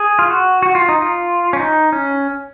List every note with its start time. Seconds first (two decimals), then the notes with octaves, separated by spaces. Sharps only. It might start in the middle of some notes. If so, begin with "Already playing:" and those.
Already playing: G#4
0.19 F4
0.30 F#4
0.63 F#4
0.75 F4
0.89 D#4
1.02 F4
1.53 C#4
1.60 D#4
1.92 C#4